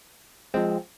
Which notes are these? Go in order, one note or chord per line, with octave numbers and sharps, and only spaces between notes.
F3 G#3 C4